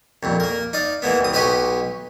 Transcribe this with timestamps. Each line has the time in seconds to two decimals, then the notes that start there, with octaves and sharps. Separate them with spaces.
0.23 C2 F2 A#2
0.40 A#3 A#4
0.73 D#4 D5 F5
1.02 E3 G#3 A#3 B3
1.21 C2 D#6
1.33 B1 G4 B4 D#5 G#5 C#6